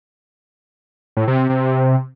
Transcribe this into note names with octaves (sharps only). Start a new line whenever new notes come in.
A2
C3
C3
C3